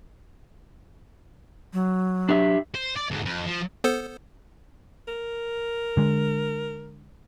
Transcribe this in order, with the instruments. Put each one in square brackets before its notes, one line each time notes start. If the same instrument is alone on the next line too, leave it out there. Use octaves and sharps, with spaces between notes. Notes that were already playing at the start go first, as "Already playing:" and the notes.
[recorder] F#3
[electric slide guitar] D4 G4 E5
[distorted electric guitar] C5
D5
D2 G#2
F2
F3
[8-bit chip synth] B3 A4 C5
[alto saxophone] A#4
[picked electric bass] D3 G#3